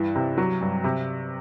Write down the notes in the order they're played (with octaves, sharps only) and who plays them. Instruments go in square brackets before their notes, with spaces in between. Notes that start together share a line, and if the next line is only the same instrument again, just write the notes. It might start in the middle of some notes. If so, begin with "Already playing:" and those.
Already playing: [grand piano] G2 E3
C3
F#3
G2
C3